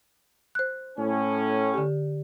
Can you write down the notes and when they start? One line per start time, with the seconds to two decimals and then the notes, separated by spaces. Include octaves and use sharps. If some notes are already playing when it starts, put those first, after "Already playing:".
0.55 C5 F#6
0.99 A2 C#4
1.74 D3 G4